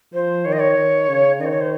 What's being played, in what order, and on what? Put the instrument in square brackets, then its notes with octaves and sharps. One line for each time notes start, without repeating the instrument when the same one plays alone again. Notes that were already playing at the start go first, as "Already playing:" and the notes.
[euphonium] F3 [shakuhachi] C5
[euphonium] D#3 [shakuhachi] C#5
[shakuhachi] D#5
C#5
[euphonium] D#3
C#3
[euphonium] D#3 [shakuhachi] D#5
[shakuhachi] C5
C#5
C5